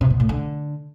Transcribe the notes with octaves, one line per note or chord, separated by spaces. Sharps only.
C3
B2
A2
D3